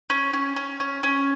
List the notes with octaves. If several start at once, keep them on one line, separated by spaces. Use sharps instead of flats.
C#4
C#4
C#4
C#4
C#4